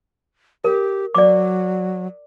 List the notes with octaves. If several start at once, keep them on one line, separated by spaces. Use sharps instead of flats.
G4 A#4
F#3 D5 D6